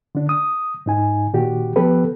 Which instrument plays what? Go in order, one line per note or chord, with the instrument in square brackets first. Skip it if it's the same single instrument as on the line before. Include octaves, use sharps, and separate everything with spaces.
[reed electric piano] D3 D4
D#6
G#2 D#4 G#5
A#2 D#3 F#4 G4
F3 B3 G4 A4 B4